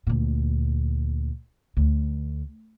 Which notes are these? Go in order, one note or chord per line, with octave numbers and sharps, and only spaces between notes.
D2 A#2
D2